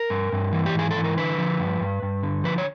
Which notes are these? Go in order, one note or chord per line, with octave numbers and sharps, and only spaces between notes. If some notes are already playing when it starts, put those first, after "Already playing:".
Already playing: A#4
G2
G2
E3
G4
G#2 G#4
A4
E3
A#4
D3 B4
F3
G2
G2
G2
D3
F3 B4
C#5